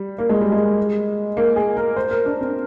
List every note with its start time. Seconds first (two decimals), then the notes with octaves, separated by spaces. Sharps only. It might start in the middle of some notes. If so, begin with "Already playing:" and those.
Already playing: G3
0.18 A#3
0.29 G#3
0.41 G3
0.52 G#3
1.37 A#3
1.56 G#4
1.77 A#4
1.96 C5
2.11 A#4
2.26 D4
2.41 C4